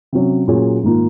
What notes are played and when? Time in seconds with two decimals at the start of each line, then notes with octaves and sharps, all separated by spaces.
0.13 C3 F#3 C#4
0.48 A#2 F#3 C#4 G#4 C#5
0.83 G#2 D#3 A#3 F4